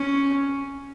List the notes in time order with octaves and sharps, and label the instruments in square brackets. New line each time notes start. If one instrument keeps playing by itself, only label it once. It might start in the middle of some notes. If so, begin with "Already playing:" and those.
Already playing: [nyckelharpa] C#4